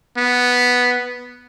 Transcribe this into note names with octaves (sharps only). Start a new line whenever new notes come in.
B3